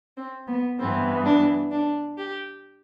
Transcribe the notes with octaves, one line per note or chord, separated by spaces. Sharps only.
C4
B3
G2 E3 B3 C4
D4
D4
G4